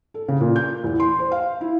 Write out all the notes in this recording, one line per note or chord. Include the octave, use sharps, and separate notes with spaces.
A4
C#3
A#2
G6
E2
C6
C5
F5
E4